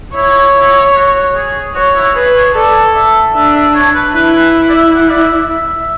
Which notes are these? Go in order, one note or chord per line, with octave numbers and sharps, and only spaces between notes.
E4 C#5
E4
F#4
G#4
F#4 C#5
E4
G#4 B4
C#5
A4 D5
E5
D4 E5
E5
C#5
B4
E4 B4
B4
D5
E5
F#5
D5
E5
E5